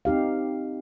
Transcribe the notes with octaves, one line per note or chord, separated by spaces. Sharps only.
C4 D#4 G4 F5